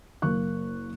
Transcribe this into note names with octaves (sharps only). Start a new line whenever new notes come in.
F#1 A#3 C#6 F#6